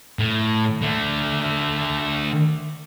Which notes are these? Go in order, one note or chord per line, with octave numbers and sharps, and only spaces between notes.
A2
D3 A3